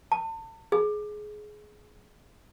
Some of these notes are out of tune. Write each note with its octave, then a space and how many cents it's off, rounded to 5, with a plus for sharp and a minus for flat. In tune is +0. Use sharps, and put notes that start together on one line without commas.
A5 +35
G#4 +20